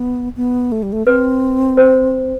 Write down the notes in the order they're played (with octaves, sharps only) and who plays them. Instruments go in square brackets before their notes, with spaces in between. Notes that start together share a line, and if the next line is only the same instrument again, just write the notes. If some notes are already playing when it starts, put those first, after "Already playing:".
Already playing: [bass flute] B3
B3
A3
G3
A3
[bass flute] C4 [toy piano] B4
[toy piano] C5